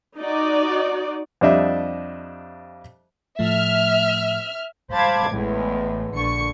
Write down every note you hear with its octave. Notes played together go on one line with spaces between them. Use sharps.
D#4 F#4 D5
F2 G3 D4 D#5 E5
A2 F3 A3 E5 F6
C5 F5 A5 B5 D6 G#6
A1 E2 A2 G#3
A#1 D3 C#6 C#7